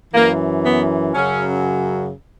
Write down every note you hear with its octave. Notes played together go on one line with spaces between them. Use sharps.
F#2 E3 A#3
B3
F#2 C#3 F#3 C#4